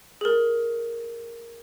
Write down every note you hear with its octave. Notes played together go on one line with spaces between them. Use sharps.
G#4 A#4